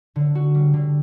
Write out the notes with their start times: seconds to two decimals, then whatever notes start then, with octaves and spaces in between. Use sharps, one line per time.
0.16 D3
0.35 F#4
0.55 G3
0.74 D3